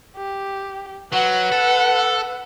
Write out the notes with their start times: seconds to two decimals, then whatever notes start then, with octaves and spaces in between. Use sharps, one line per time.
0.17 G4
1.13 F#3 B4 F#5
1.52 A4